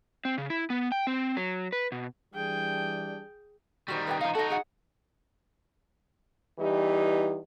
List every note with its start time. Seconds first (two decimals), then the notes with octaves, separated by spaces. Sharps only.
0.25 C4
0.38 C#3
0.50 E4
0.70 B3
0.92 G5
1.07 C4
1.37 F#3
1.72 B4
1.92 B2
2.35 E3 G3 D4 G#4 G5
3.88 D#3 G3 F#4 C5
4.07 B4 E5 G5
4.21 F3 D#4 F5 A#5
4.35 D#4 F#4 A4 D#5
4.50 G#4 F#5
6.59 E2 E3 G3 D#4 G4